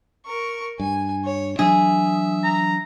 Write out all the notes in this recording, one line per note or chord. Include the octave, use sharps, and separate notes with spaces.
A#4 C#6
G2 G#5
C#5
E3 F#3 D4 G#4 E5
A#5